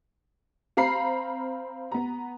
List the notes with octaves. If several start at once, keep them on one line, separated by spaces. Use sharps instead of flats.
C4 F5 A#5 B5 C7
B3 A#5